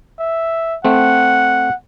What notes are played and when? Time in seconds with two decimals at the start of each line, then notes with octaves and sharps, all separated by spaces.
0.19 E5
0.85 A3 C4 F#5